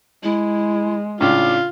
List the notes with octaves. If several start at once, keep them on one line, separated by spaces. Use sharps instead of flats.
G#3 E4
A2 C#3 D4 F4 D6